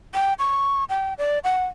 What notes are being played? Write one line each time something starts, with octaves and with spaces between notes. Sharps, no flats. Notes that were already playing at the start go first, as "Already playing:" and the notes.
G5
C#6
G5
D5
F#5